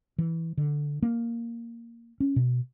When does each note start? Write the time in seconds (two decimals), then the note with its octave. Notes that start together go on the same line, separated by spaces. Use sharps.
0.18 E3
0.57 D3
1.02 A#3
2.20 C#4
2.36 B2